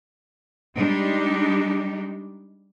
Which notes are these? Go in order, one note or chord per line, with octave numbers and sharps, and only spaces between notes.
G3 G#3 D4 D#4 G4